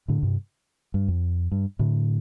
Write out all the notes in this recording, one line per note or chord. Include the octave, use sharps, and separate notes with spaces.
A2 D3
G2 C3
G2
F2
G2
A2 D3